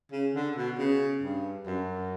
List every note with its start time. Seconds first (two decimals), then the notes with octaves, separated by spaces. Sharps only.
0.12 C#3
0.34 D3
0.56 B2
0.78 C#3
1.22 G2
1.67 F#2